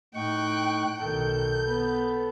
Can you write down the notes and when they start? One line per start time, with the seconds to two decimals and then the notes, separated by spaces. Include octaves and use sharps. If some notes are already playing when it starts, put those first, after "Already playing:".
0.15 A2 D#4 G5 C#6 F#6
0.99 B1 D#3 A4 G6
1.66 B3